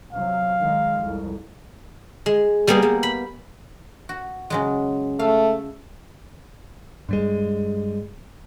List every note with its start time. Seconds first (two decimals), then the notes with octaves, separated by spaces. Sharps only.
0.13 C3 F#3 F5
0.60 D#3 G#3
1.00 C2 F2
2.26 G#3
2.67 G3 A#3 B3 G#4
2.82 G3
3.03 B5
4.09 F#4
4.50 C#3 F#3 G#3
5.19 A3 F5
7.09 G2 G3 G#3